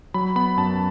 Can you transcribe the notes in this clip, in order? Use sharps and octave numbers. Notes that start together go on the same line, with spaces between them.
F#3 B5
B3 B5
F#2 A5